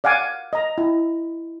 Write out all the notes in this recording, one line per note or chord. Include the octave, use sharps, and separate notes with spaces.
D5 F5 F#5 G#5 D6
D#5 A#5
E4